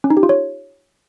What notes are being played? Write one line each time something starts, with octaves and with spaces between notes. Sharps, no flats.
C#4
D#4
G4
F4
C#5